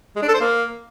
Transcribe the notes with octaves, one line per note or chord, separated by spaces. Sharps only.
G#3
D4
A4
C5
A#3